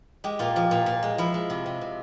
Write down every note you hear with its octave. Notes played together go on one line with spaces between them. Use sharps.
G#3 G4
A#2 F4
F3
A#2
A#2
G#3
F3 E4
G#3
C3
C3
C3